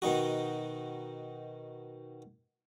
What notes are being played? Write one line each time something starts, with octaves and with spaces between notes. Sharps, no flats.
B2 D#3 D#4 F#4